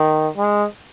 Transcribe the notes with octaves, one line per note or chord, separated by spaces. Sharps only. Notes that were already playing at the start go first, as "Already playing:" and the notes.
Already playing: D#3
G#3